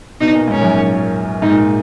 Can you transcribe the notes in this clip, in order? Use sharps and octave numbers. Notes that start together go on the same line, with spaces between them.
B2 D#4
A#2
G#2 C#4
F#2 A#2
G#2 D#4
A#2